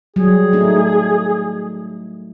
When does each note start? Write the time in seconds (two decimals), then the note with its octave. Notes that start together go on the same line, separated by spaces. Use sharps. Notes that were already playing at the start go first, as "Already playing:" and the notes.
0.16 F#3 G3 G#4
0.53 A3 D#4